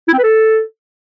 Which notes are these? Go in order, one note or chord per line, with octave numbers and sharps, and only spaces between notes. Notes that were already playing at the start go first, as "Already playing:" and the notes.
E4
C4
B4
A4